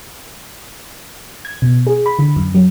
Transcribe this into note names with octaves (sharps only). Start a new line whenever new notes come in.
G#6
B2
G#4
B5
D3
F#2
F#3